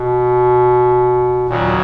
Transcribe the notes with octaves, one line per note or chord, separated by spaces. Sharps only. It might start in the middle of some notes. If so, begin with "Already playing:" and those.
Already playing: B2
D#2 A#2 C#3 F#3